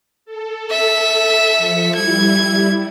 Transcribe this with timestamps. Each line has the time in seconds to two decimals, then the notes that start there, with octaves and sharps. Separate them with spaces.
0.25 A4
0.70 E5 B6
1.58 F3 C#7
1.95 G3 E4 G#6